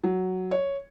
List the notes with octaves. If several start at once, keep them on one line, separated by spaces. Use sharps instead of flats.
F#3
C#5